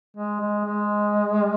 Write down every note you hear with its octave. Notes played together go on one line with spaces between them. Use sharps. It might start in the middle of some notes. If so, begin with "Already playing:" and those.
G#3
G#3
G#3